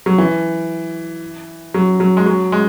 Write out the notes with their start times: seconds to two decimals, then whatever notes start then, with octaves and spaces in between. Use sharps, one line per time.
0.06 F#3
0.18 E3
1.74 F#3
2.00 F#3
2.17 G#3
2.26 F#3
2.52 G#3